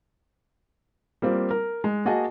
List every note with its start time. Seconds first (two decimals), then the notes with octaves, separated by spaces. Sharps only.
1.22 G3 A#3 C4 F4
1.51 A#4
1.84 G#3
2.05 A#3 F#4 G#4 D#5 A5